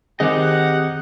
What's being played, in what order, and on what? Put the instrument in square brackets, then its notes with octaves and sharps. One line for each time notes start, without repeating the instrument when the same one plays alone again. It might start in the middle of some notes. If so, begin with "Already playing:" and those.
[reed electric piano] D#3 C4 G#4 [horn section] D#4 F#5 [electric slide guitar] G4 D#5